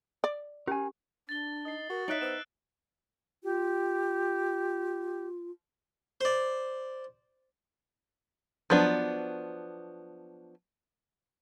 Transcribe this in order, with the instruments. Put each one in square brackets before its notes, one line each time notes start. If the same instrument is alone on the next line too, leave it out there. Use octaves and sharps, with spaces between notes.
[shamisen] D5
[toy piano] C#4 G4 [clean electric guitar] A#4 G#5
[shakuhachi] D4 [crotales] A6 G7
[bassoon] D#4 [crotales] D#6 C7
[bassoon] F#4 [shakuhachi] A#4
[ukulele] D#4 E5 [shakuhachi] C#5 [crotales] F#6 D7 F#7
[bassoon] B3 [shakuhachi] C5 [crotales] D#6 E6 E7
[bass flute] F4 [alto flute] G4
[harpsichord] C5 D5
[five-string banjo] F3 F#3 B3 D4